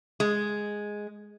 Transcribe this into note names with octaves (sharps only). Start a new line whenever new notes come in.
G#3